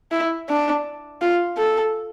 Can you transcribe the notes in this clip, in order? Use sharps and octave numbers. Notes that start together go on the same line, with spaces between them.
E4
D4
F4
A4